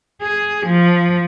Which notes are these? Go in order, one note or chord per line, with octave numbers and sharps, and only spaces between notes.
G#4
F3